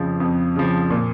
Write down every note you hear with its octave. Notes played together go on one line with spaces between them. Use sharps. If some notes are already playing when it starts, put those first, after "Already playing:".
Already playing: F2 C#3 F3
F2
C#3 F3
A#2